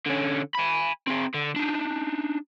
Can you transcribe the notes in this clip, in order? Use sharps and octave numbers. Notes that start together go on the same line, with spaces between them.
D3 C#4
G#5 B5
C4 G#4
D3
D4 D#4